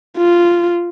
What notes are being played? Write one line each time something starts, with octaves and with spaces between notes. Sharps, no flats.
F4